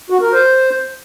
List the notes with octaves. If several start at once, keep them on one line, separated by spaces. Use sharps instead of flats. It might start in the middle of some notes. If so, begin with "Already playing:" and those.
F#4
A#4
C5